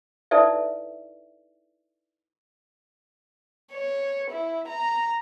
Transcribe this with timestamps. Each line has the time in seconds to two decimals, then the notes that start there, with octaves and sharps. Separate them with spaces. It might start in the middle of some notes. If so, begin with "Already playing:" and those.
0.31 D#4 E4 A4 B4 D5 E5
3.72 C#5
4.31 E4
4.68 A#5